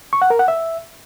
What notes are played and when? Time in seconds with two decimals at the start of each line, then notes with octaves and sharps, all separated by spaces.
0.13 C#6
0.22 F#5
0.30 A#4
0.39 F#5
0.48 E5